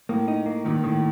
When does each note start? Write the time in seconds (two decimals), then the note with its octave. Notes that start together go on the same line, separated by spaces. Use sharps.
0.09 A2 A#3
0.28 D#4
0.46 A#3
0.65 A#2 D#3
0.84 A2 D#3